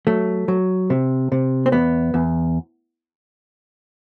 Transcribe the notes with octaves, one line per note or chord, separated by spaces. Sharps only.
F#3 A3
F#3
C3
C3
C4
E2 B3
E2